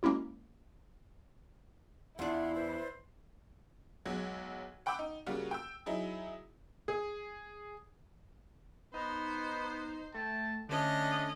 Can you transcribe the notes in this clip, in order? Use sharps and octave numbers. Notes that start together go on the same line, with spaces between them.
G#3 A#3 C#4 E4 F#4
E2 D4 E4 F4 F#5 C6
B4 C5 D5
B1 F#3 G#3 F#5 G#6
F#5 G5 B5 D6 E6
D#4
C#3 G3 A#3 F4 F#4
G5 E6
F#3 D#4 E4 G#4
G#4
B3 D#4 B4 C5
A3 G5 A5
D3 A3 C#4 D4 D#5